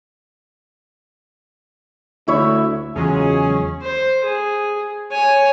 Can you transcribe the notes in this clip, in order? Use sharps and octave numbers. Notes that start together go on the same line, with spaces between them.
D2 E4 C#5 E5
E2 C#3 F#3 G#3 C#4 F4 G#4
C5
G#4
C#5 G#5